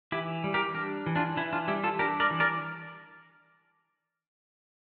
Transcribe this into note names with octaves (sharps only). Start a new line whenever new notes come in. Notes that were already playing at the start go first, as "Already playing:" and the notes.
E3 E4 G4
G3
G4 A#4
D4 G4 A#4
E3
D4 F4
E3 E4
D4 F4
G3 E4 G4
F4 A4
D4 G4 A#4
A#4 D5
E3
A#4 D5